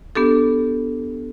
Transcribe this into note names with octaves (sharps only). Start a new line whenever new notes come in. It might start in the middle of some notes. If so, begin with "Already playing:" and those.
B3 D4 G4 A4